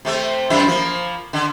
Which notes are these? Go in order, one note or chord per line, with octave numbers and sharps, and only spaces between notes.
C3 A3 C4
F#2 C3 E4
F3 A#3
D3